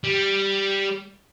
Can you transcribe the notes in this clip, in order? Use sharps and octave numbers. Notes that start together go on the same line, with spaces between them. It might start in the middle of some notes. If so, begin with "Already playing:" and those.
G3